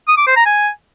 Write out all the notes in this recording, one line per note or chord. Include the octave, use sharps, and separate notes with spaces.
D#6
D6
C5
A#5
G#5